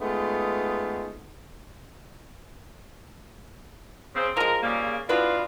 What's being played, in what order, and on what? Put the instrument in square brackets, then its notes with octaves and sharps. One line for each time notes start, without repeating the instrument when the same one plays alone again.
[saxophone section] G#3 A3 B3 D#4 F4
C#3 C4
[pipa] F3 G#3 [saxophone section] A#4
[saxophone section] C#3 G3 A#3
[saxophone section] B2 D4 F4 [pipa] E4 B4